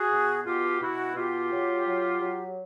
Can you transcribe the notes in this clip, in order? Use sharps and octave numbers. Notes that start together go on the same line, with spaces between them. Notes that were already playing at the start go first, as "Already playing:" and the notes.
Already playing: F#4 G#4
B2
B2 F4 G4
B2 E4 F#4
B2 F4 G4
F#3
F#3
F#3